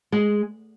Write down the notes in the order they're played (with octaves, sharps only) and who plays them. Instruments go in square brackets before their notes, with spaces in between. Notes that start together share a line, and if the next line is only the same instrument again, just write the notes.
[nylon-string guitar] G#3